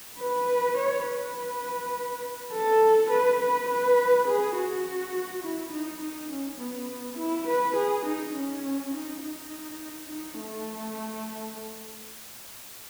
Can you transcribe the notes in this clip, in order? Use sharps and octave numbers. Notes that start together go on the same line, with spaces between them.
B4
C#5
B4
A4
B4
B4
B4
G#4
F#4
E4
D#4
D#4
C#4
B3
E4
B4
G#4
D#4
C#4
D#4
D#4
D#4
A3